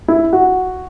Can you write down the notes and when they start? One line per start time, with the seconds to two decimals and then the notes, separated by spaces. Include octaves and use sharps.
0.08 E4
0.33 F#4